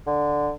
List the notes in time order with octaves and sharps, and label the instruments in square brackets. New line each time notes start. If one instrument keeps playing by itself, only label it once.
[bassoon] D3